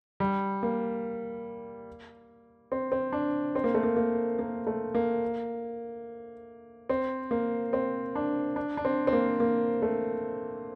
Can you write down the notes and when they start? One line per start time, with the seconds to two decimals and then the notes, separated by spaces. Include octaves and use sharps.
0.20 G3
0.63 A#3
2.72 C4
2.92 C4
3.12 D4
3.55 C4
3.64 A#3
3.74 A3
3.83 A#3
3.97 A#3
4.39 A#3
4.67 A3
4.95 A#3
6.89 C4
7.31 A#3
7.73 C4
8.15 D4
8.56 D4
8.77 D4
8.85 C4
9.07 C4
9.13 A#3
9.40 A#3
9.82 A3